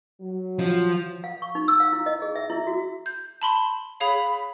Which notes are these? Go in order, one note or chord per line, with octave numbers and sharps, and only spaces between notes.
F#3
F3
F5
C#6
D#4
E6
F5
E4
D#5
G#4
E5
E4
F#4
G6
A5 B5 C6
G#4 C#5 F5 B5